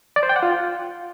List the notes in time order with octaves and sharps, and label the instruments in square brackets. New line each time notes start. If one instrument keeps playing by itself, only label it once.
[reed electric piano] D5
C5
G5
F#5
F4